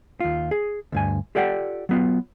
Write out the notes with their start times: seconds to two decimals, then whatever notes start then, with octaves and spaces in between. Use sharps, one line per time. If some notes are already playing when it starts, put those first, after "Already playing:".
0.20 D#2 F4
0.51 G#4
0.92 D2 G2 G#5
1.35 F4 G4 A4 D5 F#5 G5
1.89 F#3 B3 F4